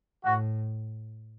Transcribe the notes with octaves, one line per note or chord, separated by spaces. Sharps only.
A2 F#4